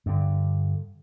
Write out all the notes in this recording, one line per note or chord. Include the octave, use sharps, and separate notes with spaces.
G2 D3